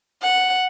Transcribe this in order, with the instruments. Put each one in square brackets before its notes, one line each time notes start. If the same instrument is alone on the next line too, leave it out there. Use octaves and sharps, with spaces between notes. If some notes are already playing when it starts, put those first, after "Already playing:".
[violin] F#5